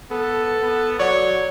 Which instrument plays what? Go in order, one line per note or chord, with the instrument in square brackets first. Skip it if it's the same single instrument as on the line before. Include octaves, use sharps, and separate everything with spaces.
[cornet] B3 [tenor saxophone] A4
[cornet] B3
[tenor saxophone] F#3 [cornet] C#5 [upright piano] D5